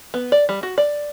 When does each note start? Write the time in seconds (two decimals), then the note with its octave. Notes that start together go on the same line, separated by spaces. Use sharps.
0.14 B3
0.32 D5
0.49 G3
0.63 F#4
0.78 D5